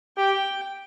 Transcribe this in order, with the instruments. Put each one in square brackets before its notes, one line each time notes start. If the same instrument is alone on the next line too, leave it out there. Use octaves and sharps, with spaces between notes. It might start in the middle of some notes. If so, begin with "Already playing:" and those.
[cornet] G4 [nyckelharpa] G5